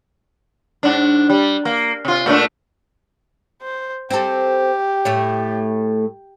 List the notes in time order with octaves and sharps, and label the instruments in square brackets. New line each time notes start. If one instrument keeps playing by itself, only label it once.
[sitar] G#2 D4
G3
A#3
C3 F4
A#2 A3 D4
[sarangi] C5
[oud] C4 A4 [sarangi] G4
[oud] A2 A3 C#5